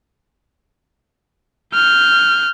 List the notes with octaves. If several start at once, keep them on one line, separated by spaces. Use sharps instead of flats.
F6 G6